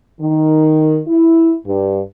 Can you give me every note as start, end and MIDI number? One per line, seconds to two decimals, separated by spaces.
0.20 0.99 51
1.07 1.53 64
1.65 2.00 43